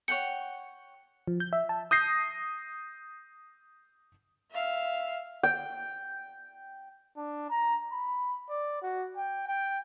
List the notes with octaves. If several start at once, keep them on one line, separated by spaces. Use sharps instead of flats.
C#5 F#5 G5 C#7
F3
G6
E5
A5
D#6 G6 A#6 C7
E5 F5
G5
D4
A#5
B5
D5
F#4
G5
G5